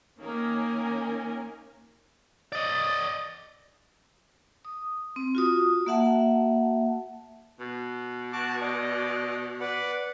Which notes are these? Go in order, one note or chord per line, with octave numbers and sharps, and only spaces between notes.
D#3 A#3 C#4 A#4 G#5
D5 D#5
D#6
C4
F4 F#4 D#6
A#3 F#4 E5 F#5 A5
B2
F#4 A5 D6
D5 D#5
B4 D5 F#5